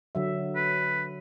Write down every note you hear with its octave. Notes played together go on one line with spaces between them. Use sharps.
D3 F#3 E5
B4